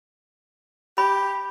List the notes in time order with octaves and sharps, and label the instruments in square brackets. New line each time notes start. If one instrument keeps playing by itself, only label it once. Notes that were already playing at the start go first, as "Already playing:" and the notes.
[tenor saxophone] G4 [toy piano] B5